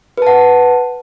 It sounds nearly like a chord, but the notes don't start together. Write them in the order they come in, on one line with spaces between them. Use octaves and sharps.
B4 A5 F#5